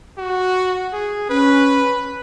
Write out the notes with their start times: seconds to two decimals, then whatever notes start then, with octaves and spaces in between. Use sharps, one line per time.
0.18 F#4
0.92 G#4
1.30 C#4 B4